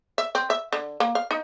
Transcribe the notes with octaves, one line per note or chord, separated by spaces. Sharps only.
E5
C4
E5
D3
A#3
F5
D#4